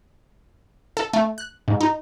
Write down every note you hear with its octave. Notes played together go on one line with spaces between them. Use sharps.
A4
A3
F#6
G#2
D#4